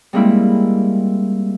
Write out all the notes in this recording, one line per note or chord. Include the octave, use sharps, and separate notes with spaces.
G3 G#3 A#3 C4 E4